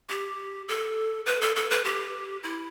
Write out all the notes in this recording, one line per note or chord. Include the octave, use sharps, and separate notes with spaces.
G4
A4
B4
A4
A4
B4
G4
E4